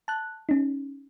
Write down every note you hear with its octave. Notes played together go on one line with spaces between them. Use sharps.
A5 F#6
C#4 D#4